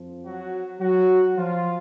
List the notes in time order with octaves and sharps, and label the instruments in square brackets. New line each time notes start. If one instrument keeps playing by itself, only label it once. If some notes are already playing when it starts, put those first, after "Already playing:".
Already playing: [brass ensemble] F2 F3
F#3 F#4
F#3 F#4
F3 F4